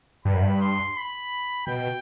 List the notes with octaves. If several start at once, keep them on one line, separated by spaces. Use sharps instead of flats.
G2 B5
F#2
G2
C6
B5
B2 G5